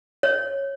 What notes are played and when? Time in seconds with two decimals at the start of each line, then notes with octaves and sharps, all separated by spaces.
0.23 C#5